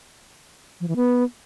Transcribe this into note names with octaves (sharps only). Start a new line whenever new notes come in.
F3
E3
B3